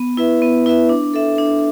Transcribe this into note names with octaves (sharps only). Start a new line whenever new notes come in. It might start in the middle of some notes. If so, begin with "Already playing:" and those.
Already playing: B3
E4 B4 E5
B3
E4 B4 E5
D4
A4 E5
D4